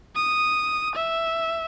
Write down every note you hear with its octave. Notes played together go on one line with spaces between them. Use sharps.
D#6
E5